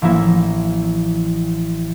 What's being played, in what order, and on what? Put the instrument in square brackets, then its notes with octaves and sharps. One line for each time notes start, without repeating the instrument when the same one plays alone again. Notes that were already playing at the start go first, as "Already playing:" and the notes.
[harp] A1 F3 A#3 E4